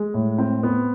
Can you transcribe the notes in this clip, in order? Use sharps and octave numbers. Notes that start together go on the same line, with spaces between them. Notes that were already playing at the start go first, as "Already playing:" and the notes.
Already playing: G#3
A2
C4
B3